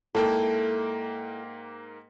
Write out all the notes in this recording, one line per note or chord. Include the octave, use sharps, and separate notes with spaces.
G#2 A#3 E4 A4 G5